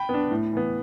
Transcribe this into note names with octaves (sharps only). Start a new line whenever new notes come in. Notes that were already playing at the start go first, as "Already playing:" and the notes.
Already playing: G5 B5
B3 D4
A2
E3 B3